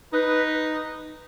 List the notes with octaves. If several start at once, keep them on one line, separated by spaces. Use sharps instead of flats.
D#4 B4